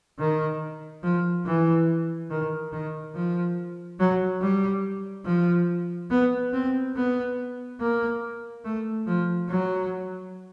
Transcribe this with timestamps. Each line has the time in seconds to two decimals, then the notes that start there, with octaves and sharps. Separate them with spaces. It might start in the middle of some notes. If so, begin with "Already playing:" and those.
0.19 D#3
1.03 F3
1.46 E3
2.30 D#3
2.72 D#3
3.15 F3
3.99 F#3
4.41 G3
5.25 F3
6.10 B3
6.53 C4
6.96 B3
7.80 A#3
8.65 A3
9.07 F3
9.49 F#3